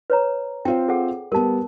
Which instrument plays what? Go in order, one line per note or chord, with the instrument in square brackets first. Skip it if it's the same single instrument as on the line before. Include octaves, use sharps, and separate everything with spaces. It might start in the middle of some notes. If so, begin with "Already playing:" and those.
[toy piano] B4 C#5 A#5
[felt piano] C4 F4 C5 [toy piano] G5
[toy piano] G#4 A4 F#5
[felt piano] G3 B3 [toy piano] A#4 A5